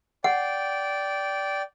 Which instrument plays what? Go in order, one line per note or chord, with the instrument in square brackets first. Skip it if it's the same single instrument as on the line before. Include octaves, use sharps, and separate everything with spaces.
[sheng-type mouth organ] D5 G5 [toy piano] F#5